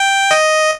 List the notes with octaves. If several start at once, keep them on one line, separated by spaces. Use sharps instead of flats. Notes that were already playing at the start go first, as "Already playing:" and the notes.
Already playing: G5
D#5